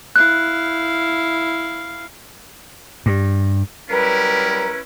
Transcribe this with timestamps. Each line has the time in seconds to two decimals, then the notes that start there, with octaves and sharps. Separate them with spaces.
0.16 E4 F5 F#6
3.06 G2
3.90 F#3 G3 C#4 E4 A#4 B4